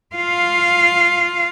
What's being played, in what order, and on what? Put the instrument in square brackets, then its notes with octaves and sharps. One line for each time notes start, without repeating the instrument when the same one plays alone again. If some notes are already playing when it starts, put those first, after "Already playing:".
[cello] F4 F5